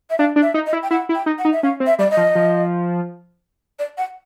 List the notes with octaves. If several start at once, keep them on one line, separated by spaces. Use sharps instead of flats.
E5
D4 F5
D4
E5
D#4
D#5
E4
G5
E4 F#5
E4
G5
D#4
F#5
D#4
E5
C#4 F5
C4
E5
G3 D5
D#5
F3
F3
D5
F#5